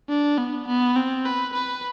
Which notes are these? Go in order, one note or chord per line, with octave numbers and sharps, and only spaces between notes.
D4
B3
B3
C4
B4
B4